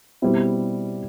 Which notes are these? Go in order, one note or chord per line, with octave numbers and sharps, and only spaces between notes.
B2 G3 C4 E4